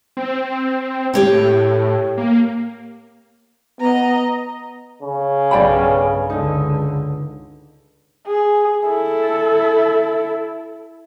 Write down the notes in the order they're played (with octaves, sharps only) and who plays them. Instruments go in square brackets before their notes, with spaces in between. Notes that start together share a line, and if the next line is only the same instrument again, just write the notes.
[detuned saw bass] C4
[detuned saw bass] A2 [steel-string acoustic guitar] G4 C#5 G5
[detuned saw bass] A#3
[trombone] B3 [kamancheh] D#5 A#5
[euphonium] C#3
[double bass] B1 G2 [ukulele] D5 G5 B5
[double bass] C#2 D3 [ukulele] D#4
[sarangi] G#4
[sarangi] E4 [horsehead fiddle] A4